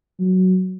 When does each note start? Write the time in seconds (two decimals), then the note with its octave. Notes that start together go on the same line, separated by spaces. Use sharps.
0.20 F#3